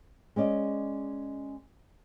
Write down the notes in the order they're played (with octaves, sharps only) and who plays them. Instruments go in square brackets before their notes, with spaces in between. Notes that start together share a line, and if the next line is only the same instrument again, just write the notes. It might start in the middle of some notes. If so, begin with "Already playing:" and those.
[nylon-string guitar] G#3 C#4 D5 D#5